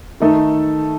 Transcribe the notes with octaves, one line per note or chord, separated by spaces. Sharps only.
D#3 A3 D#4 A4